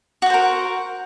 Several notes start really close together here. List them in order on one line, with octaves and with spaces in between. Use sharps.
F#4 F#5 C5 A#4